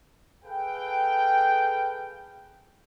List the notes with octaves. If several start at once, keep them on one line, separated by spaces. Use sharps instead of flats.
G#4 A4 B4 F5 G5